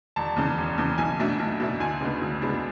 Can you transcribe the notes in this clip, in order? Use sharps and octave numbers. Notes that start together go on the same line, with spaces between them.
E1 A5
E2 C#3
E1
E2 C#3
B1 G#5
B2 A3 D4
B1
B2 A3 D4
D2 G#5
C#3 G#3 B3 D4
D2
C#3 G#3 B3 D4